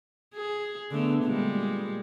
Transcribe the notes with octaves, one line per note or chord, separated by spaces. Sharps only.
G#4
D3 A3 B3
A#2 G3 G#3